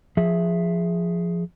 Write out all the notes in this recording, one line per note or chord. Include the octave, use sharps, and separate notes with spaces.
F3 G#4 E5